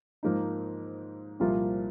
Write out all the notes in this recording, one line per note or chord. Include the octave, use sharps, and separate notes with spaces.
G#2 F3 A#3 D#4
C2 A#2 F3 A#3 F4